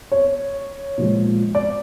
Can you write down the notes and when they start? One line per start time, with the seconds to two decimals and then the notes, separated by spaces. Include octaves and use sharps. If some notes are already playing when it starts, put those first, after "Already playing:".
0.12 C#5
0.98 A#2 F3 G#3
1.55 D5